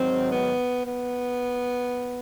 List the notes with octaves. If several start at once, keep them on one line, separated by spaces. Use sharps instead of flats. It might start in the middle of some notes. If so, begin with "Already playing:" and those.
Already playing: G#2 D#3 F#3 C4
B3
B3